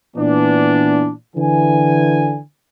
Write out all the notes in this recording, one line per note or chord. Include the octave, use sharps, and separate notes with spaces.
A#2 E3 B3 D4
D3 E3 G#5